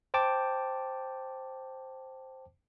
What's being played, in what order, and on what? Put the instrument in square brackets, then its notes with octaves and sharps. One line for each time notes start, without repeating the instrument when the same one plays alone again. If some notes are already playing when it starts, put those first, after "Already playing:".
[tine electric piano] C5 G5 A5 D6